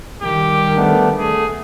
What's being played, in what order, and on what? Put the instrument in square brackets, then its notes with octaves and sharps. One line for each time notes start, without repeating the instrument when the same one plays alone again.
[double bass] D#3 G3 [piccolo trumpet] G4
[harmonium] A3 B3 D4
[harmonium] A3 [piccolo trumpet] G#4